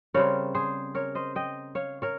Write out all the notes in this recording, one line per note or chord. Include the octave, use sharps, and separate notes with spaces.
C#3 G3 C4 A#4 C#5
G#4 C5
A#4 C#5
C5 D#5
D#5 G5
C#5 F5
A#4 C#5